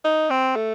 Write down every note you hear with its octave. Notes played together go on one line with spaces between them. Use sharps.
D#4
C4
A3